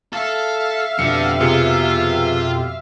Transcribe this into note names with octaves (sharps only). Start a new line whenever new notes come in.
A4 E5 F5
F2 B2 D3 G4 C#7
C3 F4 G#4 C#7